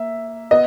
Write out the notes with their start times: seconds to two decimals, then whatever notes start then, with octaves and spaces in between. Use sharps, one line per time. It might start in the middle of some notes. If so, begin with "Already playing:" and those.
Already playing: A#3 E5
0.51 B3 D#5